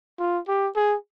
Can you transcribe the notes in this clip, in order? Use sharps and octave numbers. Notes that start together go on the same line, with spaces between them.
F4
G4
G#4